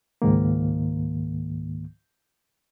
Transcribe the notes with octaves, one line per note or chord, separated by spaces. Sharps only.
C#2 G#2 D#3 A#3